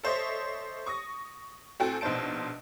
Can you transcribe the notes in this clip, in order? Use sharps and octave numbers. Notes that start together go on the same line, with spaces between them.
A4 C5 C#5 D#5 E5
C#6 D#6 A#6
A2 C4 F#4 A4 G5 G#5
A#1 B2 D#4 C5 A5 D7